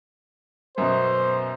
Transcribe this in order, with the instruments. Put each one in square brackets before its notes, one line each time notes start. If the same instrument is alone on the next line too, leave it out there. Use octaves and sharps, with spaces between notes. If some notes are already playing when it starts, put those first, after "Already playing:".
[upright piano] F#2 B2 [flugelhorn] C5